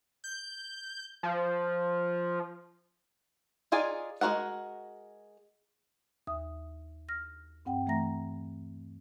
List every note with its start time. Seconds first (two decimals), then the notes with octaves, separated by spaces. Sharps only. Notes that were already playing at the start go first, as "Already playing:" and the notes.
0.24 G6
1.23 F3
3.72 D#4 F4 G#4 D5 G#5
4.21 G#3 F4 F#4 A#4 F#5
6.27 D#2 E5 D#6
7.09 F6 A#6
7.65 G2 C4 F#5 G5
7.86 E3 A3 E5 A#5 A#6